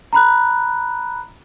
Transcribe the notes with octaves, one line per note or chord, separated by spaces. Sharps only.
A#5 B5 F#6